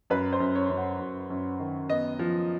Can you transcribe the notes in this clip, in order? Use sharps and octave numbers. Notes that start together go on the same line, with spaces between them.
F#2 B4
C5
F#2
C#5
F#2
F#5
F#2
F#2
D#3
B3 D#5
F3